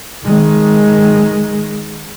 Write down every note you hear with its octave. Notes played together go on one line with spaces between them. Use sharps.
D#3 G#3